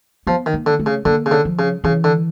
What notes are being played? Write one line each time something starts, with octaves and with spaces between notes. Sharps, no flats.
F3 B3
D#3
A#3
D3
A3
C#3
D3 A#3
C#3
D3
F3
C#3
C#3 E3
D3